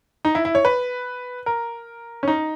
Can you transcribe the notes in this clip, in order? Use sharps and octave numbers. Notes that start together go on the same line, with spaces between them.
D#4
E4
E4
C#5
B4
A#4
C#4
D#4